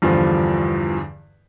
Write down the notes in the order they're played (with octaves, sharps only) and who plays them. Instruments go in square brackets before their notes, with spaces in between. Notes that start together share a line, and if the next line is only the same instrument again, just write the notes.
[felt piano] E2 G2 D3 F3